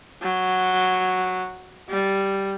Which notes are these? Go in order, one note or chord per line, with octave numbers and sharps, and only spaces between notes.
F#3
G3